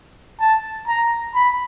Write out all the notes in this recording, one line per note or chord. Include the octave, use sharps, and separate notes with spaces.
A5
A#5
B5